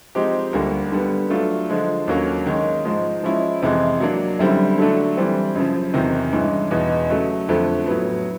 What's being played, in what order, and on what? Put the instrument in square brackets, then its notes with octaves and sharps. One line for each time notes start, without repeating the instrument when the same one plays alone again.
[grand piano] F3 G#3 C4 D#4 G4
D2 D3 G3 A#3
D3 G3 B3
F#3 A3 D4 F4
D3 F3 G#3
D#2 D3 F#3 A#3 C#4
D#3 G#3 C#4
G#2 F3 G#3
F3 G#3 C#4 E4
F2 C3 E3 G#3
F#3 A#3 D4
F#2 D3 G3 C4 E4
D3 F#3 A3 D4
E3 G3 C4
F#2 C#3 F3
E2 C3 D#3
G2 E3 G#3 C#4
E2 B2 G#3 B3 D#4
C#3 F#3 A3
F2 D3 F3 A3
A2 F#3 B3